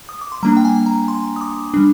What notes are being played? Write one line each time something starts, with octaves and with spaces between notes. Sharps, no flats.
D#6
D6
C6
G3 A#3 D4 A#5
G5
G#5
A#5
C6
D#6
D6
G3 D4